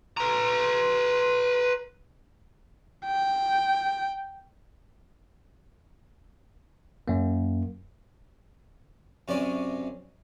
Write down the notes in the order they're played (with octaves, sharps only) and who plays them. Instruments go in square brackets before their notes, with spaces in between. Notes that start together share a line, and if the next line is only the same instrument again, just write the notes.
[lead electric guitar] B4 A#5
[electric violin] G5
[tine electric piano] F#2 A#3
[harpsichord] F#2 C3 C#4 D5 F5